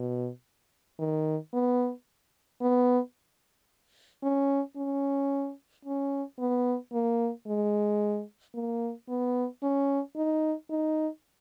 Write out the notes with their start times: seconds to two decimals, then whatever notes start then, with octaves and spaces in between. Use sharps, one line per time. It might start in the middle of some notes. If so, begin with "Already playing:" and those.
Already playing: B2
0.99 D#3
1.53 B3
2.61 B3
4.23 C#4
4.76 C#4
5.85 C#4
6.39 B3
6.92 A#3
7.47 G#3
8.54 A#3
9.08 B3
9.62 C#4
10.16 D#4
10.70 D#4